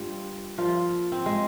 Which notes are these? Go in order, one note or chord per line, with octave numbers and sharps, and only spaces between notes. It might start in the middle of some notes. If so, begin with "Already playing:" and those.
Already playing: G2 G3 F4
A#2 F3 F4
C4
G#3